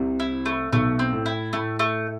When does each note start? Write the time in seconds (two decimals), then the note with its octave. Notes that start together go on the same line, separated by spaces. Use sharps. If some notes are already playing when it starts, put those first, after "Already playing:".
Already playing: C2 C3
0.20 E4
0.46 A3
0.72 B1 B2 A3
0.99 C4
1.13 A2
1.26 E4
1.53 A2 A3
1.79 A3